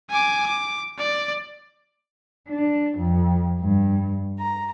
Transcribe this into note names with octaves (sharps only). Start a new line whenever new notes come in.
G#5 D6
D6
D5
D4
F2
G2
A#5